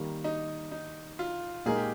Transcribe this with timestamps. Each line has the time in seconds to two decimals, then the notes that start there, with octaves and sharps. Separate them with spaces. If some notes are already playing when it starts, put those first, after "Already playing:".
Already playing: D#3 G3 A#3
0.24 D#4
0.72 D#4
1.19 F4
1.65 A#2 G#3 D#4 G#4 A#4
1.76 G4